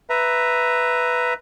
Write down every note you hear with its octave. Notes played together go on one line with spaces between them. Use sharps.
B4 E5 A#5